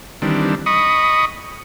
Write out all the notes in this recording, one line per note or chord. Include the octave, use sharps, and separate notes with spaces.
D#3 E3 G3 C4 D4
D#5 B5 C#6 D#6